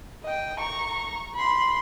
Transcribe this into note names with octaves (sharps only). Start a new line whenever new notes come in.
D#5 G5
A#5 C#6
B5 C6